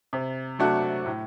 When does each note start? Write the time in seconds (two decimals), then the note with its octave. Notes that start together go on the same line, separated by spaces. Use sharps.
0.13 C3
0.59 F#3 A3 D4 F#4
1.06 A2